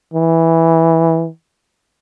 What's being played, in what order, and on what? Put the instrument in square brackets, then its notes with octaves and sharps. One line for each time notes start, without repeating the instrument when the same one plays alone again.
[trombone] E3